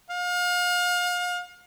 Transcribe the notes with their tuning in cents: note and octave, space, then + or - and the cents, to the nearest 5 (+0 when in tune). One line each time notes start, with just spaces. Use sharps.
F5 +35